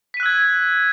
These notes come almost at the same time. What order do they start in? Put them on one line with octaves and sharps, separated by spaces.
B6 D#7 F#6 E6 G#6